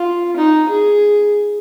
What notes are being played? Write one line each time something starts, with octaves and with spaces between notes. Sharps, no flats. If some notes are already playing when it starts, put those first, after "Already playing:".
Already playing: F4
D#4
G#4